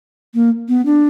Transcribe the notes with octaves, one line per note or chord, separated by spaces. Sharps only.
A#3
B3
D4